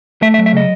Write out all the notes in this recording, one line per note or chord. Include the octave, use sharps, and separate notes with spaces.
A3 E5
E5
F#3
E5
C#3 D#5